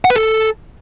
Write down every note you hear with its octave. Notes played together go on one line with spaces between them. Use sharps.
F#5
B4
A4